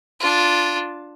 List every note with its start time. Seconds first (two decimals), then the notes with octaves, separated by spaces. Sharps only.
0.20 D4 F4